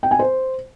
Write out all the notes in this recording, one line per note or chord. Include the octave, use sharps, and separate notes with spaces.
G5
G#5
C5